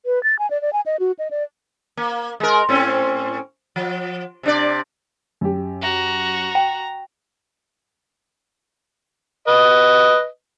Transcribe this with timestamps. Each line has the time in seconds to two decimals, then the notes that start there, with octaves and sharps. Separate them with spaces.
0.06 B4
0.23 A6
0.39 G#5
0.50 D5
0.62 D5
0.73 G#5
0.86 D#5
1.00 F#4
1.19 D#5
1.31 D5
1.97 A#3
2.40 G#3 A#4
2.69 A2 C4 C#4
3.76 F3
4.43 C3 D4 D5
5.41 F#2 G4
5.82 F#4 A#5
6.55 G5
9.48 B4 D#5